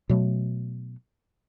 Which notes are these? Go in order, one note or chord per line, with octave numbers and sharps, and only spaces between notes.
B2 F#3 A3